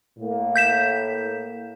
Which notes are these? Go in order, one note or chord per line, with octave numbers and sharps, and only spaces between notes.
A2 A#3
G6 B6 E7